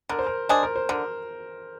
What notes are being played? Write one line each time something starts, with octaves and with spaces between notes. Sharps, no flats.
D3 A#4
C5
A#4
G#3 D4 G#4 C5
A#4
C5
D3 A#4